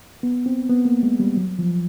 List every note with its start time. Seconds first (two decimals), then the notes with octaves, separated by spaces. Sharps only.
0.23 B3
0.46 C4
0.69 B3
0.85 A#3
1.03 G#3
1.20 G3
1.37 F#3
1.59 F3